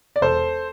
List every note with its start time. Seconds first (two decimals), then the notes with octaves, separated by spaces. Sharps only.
0.16 D5
0.21 E1 A4 C5